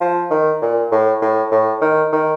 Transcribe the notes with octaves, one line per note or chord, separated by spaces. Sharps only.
F3
D#3
A#2
A2
A2
A2
D#3
D#3